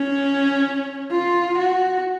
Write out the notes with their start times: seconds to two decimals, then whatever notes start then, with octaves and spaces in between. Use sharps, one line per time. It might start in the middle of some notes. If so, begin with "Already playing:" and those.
Already playing: C#4
1.11 F4
1.58 F#4